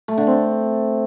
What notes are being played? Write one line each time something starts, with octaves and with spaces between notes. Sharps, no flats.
A3
D3
C4